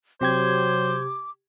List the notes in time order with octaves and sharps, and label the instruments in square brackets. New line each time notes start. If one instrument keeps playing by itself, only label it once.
[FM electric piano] C3 G4 G#6 [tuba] F#3 [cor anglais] C5 [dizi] D6